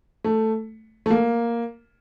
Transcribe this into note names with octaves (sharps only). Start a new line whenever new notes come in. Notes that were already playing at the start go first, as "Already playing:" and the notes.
A3
A3
A#3